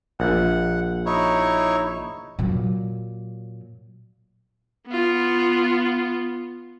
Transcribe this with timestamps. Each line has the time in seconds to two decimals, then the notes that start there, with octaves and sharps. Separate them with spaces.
0.20 A#1 F#5
1.06 D#4 E4 C#5
2.39 A#2 F#3
4.87 B3 F4